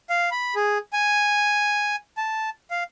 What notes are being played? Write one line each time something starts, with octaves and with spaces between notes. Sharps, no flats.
F5
B5
G#4
G#5
A5
F5